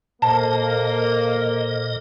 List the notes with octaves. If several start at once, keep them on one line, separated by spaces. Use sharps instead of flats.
A#2 A#3 A4 C5 D#5 A5